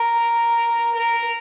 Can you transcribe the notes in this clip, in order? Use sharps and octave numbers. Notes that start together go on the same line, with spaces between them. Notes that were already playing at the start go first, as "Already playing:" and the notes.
Already playing: A#4
A#4